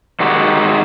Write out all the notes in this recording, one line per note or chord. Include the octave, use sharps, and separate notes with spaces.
D#3 G#3 F#4 G4